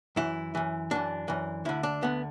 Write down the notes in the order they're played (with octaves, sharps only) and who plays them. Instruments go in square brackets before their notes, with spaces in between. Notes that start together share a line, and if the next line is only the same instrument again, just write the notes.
[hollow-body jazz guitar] F#2 E3 E4
F#2 E3
F#2 E3 D4
F#2 E3
D2 D3 E4
D4
D2 D3 B3